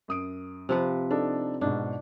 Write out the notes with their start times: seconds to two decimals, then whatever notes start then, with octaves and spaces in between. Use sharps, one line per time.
0.08 F#2 D#6 D7
0.69 C3 F3 B4
1.11 D4 D#4 A4
1.61 G#2 B2 D4